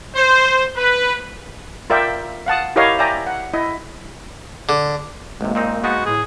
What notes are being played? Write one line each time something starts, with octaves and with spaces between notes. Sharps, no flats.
C5
B4
F4 A#4 D5 E5 G5
F5 F#5 A5 D#6
E4 G4 A#4 C#5 D#5 F5
D5 E5 G5 G#5 A#5
F#5
E4 D#5
D3
A1 C3 G#3 A#3
A#2 C4 D#4
G#3 B3 D#4 F#4
A2 G#4